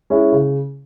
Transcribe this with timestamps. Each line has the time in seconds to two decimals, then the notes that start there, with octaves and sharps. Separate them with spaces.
0.10 G#3 C#4 E4
0.32 C#3